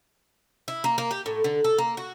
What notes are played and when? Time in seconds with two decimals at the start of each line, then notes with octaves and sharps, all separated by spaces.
0.68 E4
0.84 A#3
0.98 A#3
1.11 G4
1.26 A2
1.44 D3
1.64 A4
1.78 A#3
1.97 F#4